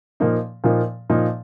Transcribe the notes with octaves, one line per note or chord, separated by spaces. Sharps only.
A#2 F3 A#3 D#4
A#2 F3 A#3 D#4
A#2 F3 A#3 D#4